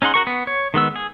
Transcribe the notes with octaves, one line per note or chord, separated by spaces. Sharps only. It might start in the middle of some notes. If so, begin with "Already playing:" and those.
C#4 D#4 G#4 F#5 C6
F#4 A#4 C#6
B3
C#5
D#3 G#3 B3 E6
G#4